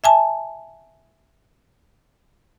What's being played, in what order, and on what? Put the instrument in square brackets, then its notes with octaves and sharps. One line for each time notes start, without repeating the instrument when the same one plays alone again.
[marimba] E5 G#5 A5